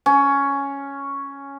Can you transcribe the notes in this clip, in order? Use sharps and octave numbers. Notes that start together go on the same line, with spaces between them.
C#4